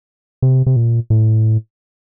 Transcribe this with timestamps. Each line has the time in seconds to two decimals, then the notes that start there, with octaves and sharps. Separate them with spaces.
0.42 C3
0.66 C3
0.76 A#2
1.10 A2